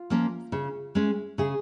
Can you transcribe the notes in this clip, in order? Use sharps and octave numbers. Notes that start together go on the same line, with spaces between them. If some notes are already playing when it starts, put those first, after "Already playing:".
Already playing: F4
F3 A#3 C#4
C#3
G#3 C#4
C#3 G#4